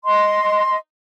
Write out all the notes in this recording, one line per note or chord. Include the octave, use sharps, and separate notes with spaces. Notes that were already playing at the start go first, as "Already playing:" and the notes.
D#5 C6